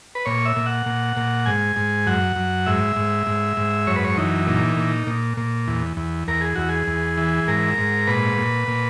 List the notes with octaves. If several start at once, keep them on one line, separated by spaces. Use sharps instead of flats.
B4
A#2 C#5
E5
A#2
F#5
A#2
A#2
G#2 G#5
G#2
F#2 F#5
F#2
G#2 E5
G#2
G#2
G#2
F#2 C#5
B4
C#5
E3 D#4
A#2 D#4
A#2
A#2
A#2
E2
E2
E2 A#4
G#4
E2 F#4
G#4
E2
E3
G#2 A#4
G#2
A#2 B4
A#2
A#2